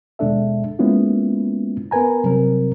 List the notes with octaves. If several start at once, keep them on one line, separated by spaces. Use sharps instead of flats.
D#2 B2 G#3 D4 A4 E5
G#3 A#3 B3 C#4 E4 F4
B3 A#4 B4 G#5 A#5
C3 F#3 G3 C4 A#4